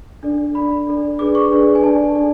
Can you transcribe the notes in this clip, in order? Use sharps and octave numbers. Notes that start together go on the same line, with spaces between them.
D4 A4 D5
D4 A4 D5 B5
D4 A4 D5
D4 G#4 B4 D5 D6
C#6
D4 G#4 B4 D5
G#5
D4 A4 D5 A5
D4 A4 D5